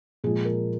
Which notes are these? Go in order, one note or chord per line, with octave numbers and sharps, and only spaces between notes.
A#2 F3 G#3 G#4
A#4